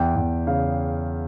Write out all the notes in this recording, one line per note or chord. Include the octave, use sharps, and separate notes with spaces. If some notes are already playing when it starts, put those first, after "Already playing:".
Already playing: E2 G5
E2
C#3 F5